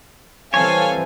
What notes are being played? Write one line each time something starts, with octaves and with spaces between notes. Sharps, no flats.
E3 G3 C4 A4 C#5 F5 G#5